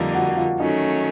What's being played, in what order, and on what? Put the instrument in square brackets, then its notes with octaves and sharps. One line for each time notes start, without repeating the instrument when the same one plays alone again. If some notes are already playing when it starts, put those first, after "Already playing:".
Already playing: [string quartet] F2 D3 G3 A#3 D#4 [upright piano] F4
[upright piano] F#4
F4
[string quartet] D#3 F#3 A3 C#4 [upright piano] D#4